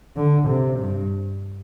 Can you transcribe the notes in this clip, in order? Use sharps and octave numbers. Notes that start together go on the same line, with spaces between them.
D3
C3
G2